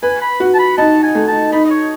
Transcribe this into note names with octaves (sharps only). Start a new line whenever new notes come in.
B4 G#5
B5
F#4
A5
B5
D#4 A5
G#5
A3
A5
D#4 B5
D#5
C#5